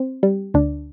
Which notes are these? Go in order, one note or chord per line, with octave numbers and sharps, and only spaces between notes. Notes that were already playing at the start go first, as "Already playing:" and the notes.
Already playing: C4
G3
D2 D4